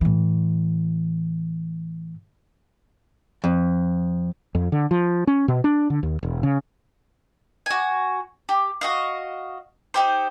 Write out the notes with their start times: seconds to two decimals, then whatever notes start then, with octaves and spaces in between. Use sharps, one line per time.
0.01 A2 E3
3.44 F2
4.55 F2
4.72 D3
4.91 F3
5.27 C#4
5.48 B2
5.64 D4
5.90 D3
6.03 D#2
6.23 E1
6.43 C#3
7.66 F#4 G#5
8.49 G4
8.81 F#4 D#5 F5
9.94 D#4 G4 C5